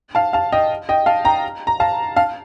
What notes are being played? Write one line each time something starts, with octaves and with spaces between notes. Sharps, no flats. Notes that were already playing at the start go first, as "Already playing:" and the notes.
F5 A5
F5 A5
D#5 G5
D#5 G5
F5 A5
G5 A#5
A#5
F5 A5
F5 A5